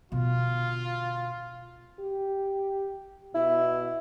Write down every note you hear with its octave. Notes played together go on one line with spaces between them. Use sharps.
B2 D3 F4
G4
B2 E4